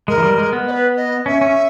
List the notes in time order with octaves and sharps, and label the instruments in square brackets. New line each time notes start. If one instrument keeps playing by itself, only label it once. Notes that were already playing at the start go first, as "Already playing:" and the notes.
[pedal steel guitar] G#3 [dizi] A#4
[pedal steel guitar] E3
G3
G#3
B3
[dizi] D#5
B4
D#5
[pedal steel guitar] C#4 [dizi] E5
[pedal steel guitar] C#4